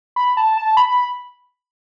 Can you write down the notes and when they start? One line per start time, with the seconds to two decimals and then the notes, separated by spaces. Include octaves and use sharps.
0.16 B5
0.37 A5
0.57 A5
0.77 B5